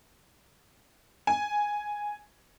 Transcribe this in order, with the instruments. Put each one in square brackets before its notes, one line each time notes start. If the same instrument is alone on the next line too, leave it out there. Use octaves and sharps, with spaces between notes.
[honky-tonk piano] G#5